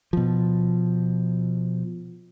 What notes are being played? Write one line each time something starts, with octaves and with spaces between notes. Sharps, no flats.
B2 F3